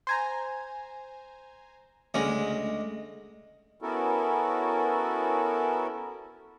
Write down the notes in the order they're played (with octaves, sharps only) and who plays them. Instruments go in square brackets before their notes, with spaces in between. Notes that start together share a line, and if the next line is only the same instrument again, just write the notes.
[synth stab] C5 G#5 A#5
[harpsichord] D2 G#3 [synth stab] C#3 C#4
[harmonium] B3 C#4 E4 F#4 A4 A#4